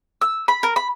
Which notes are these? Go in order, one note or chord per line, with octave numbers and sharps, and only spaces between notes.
E6
B5
A#4
B5